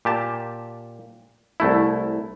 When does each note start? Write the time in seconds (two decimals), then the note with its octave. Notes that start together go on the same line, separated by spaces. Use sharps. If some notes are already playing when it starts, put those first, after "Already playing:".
0.05 A#2 G4 A5
1.60 C2 A3 E4